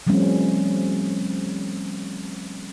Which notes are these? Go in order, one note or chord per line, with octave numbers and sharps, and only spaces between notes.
F3 G3 A3 C4 C#4